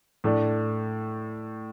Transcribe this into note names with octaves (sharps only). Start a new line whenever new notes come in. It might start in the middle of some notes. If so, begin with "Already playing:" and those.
A2 A3 D4